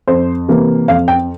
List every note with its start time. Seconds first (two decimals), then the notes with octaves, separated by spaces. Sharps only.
0.07 F2 C5
0.48 C3 E3 A#3
0.88 F2 F5
1.08 G5